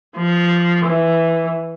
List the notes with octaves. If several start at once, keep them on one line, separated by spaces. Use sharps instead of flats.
F3
E3